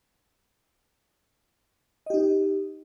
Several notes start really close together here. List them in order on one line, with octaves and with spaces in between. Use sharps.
D#5 G4 D#4